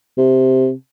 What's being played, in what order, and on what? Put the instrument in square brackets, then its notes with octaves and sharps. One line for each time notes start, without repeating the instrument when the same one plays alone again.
[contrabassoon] C3